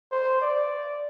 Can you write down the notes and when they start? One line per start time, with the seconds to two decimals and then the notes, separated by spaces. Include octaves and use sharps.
0.12 C5
0.42 D5